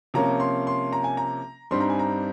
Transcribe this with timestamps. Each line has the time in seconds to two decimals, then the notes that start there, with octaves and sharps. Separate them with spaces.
0.14 C3 F3 A#3 C#4 A#5
0.40 C6
0.67 C6
0.93 A#5
1.04 G#5
1.17 A#5
1.71 G2 G3 C4 D#4 C6
1.81 A#5
1.89 G#5
1.99 A#5